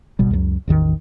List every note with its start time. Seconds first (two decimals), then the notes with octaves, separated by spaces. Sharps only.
0.19 G#1 B2 G3
0.31 C#2 F#2 F3 F#3
0.68 A1 E2 D#3